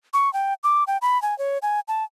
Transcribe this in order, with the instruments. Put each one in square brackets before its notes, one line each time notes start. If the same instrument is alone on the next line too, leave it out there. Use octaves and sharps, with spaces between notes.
[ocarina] C#6
G5
D6
G5
B5
G#5
C#5
G#5
A5